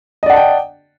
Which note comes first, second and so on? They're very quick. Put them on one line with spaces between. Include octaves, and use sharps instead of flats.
D#5 D5 F#5 A5 G5